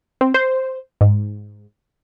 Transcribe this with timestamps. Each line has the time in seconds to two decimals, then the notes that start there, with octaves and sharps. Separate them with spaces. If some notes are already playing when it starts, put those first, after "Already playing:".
0.21 C4
0.34 C5
1.01 G#2